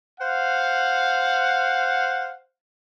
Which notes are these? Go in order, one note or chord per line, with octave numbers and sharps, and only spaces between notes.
C5 F5 F#5